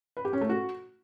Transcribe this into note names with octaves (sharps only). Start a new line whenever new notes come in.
B4
G4
C#4
A3
F#4